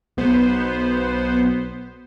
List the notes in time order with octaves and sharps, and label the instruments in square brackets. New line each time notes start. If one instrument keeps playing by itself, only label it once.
[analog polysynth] B1 B3 C5